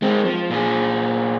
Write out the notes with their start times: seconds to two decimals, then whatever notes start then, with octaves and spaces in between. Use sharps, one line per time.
0.02 G#3 C4
0.25 F3
0.51 A#2 G#4